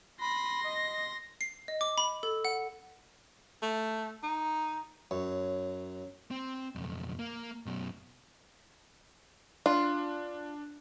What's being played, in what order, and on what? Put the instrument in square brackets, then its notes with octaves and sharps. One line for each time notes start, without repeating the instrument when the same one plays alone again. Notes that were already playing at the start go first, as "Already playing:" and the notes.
[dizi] B5 [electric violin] C6 A#6
[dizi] D#5
[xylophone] C7
D#5
D6
B5
A4
F#5
[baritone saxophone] A3
D#4
[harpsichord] F#2 [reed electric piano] C#5
[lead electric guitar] C4
B1 F2
A#3
F#2 B2
[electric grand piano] D4 [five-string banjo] F4